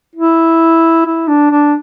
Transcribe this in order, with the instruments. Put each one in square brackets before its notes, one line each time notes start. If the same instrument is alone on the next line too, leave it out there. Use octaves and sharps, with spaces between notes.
[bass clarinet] E4
E4
D4
D4